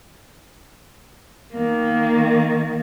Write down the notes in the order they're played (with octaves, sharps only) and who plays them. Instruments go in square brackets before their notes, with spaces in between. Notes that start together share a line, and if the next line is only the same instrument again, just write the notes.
[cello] D#3 A#3